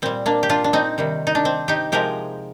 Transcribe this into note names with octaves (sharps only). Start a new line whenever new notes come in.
A#2 G3 C4
A#3 D4
G4
D4 F4
D4
C4 D#4
C3 D#3 G3
D#4
D4
C4
D#4 G4
C3 F3 G#3 G4 A#4